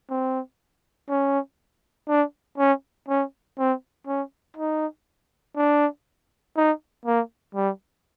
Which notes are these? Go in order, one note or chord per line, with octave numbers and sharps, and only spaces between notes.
C4
C#4
D4
C#4
C#4
C4
C#4
D#4
D4
D#4
A#3
G3